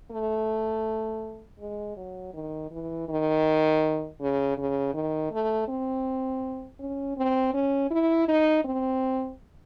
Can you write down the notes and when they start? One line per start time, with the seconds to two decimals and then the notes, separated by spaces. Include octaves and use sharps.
0.11 A3
1.60 G#3
1.97 F#3
2.34 D#3
2.71 E3
3.08 D#3
4.20 C#3
4.57 C#3
4.94 D#3
5.31 A3
5.68 C4
6.79 C#4
7.17 C4
7.54 C#4
7.90 E4
8.28 D#4
8.64 C4